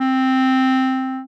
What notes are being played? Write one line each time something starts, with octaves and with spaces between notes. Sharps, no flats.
C4